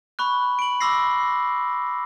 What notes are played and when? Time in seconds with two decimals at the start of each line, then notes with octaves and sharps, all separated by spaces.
0.19 B5 C#6 F#6
0.59 D7 F#7
0.81 B5 C6 D6 E6 A#6 C7